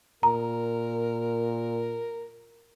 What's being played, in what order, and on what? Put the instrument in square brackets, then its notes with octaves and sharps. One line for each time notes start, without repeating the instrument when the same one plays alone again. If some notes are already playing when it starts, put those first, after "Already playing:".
[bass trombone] A#2 [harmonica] A#4 [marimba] A#5